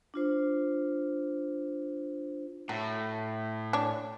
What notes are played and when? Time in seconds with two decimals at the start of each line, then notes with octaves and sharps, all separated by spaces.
0.14 D4 F4 C5
2.69 A2 F#3
3.73 D4 C#5